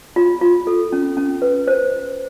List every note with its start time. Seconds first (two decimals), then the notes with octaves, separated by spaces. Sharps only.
0.16 F4
0.41 F4
0.67 A4
0.92 C#4
1.17 C#4
1.42 B4
1.68 C5